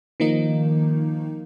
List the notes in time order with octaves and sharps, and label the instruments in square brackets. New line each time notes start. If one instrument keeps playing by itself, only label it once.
[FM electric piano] D#3 F3 A#3 D#4